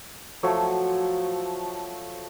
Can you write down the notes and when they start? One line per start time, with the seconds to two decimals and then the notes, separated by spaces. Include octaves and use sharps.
0.43 F3 F#3 A3 C#5